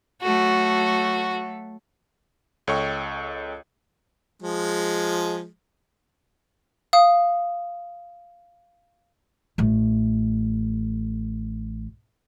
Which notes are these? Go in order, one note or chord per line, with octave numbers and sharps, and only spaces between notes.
F#3 A3 F#4 A4
C#2 A4 C#5 D#5 G5 C#6
F3 G#3
F5 D#6
A1 A3